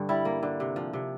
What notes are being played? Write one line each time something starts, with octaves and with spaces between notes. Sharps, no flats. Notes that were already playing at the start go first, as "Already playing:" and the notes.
Already playing: G2 D3
G3 E4
A#3
D3
C3
F3
C3